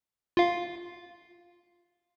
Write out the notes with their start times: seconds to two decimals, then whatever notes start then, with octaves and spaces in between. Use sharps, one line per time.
0.37 F4 F5